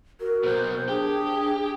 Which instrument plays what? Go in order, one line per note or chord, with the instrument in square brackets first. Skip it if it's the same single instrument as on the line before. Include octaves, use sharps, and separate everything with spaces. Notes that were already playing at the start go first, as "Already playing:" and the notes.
[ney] F#4 [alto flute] A#4
[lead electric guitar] B2 F#3 [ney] C5
[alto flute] D4 [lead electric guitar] G4 [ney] G#4